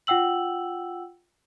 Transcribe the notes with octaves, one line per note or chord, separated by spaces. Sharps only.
F4 F#5 G5 E6 F#7